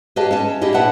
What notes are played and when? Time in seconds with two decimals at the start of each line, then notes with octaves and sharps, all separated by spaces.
0.16 G4 G#4 B4 D#5 F5 A5
0.31 C#4 E5 A5
0.62 E4 G4 G#4 D#5
0.74 A#2 D4 B4 E5 F#5 A5